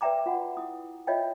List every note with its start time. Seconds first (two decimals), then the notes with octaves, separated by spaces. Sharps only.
0.01 B4 D5 E5 G5 A#5 D6
0.26 F4 F#4 F#5
0.57 E4 D#6
1.07 F4 C#5 D#5 E5 G5